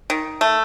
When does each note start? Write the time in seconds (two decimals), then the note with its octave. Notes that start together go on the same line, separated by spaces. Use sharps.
0.10 D#3
0.41 A3